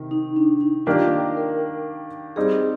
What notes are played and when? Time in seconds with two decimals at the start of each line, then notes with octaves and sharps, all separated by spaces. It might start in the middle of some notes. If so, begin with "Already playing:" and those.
Already playing: C3 D#3
0.11 D#4
0.36 D4
0.61 D#4
0.86 D#3 A#3 D4 F4 G4 D5
1.37 A#4
2.36 G3 C4 D#4 G#4